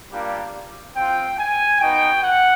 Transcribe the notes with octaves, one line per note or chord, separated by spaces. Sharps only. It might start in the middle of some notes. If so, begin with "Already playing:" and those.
G3 A#3 D4 F4
C4 F4 G5
G#5
B3 D#4 F#4 G5
F#5